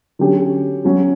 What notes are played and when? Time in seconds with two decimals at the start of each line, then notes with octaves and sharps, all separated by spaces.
0.19 D3 F#3 C#4 G4
0.84 F#3 C#4 F#4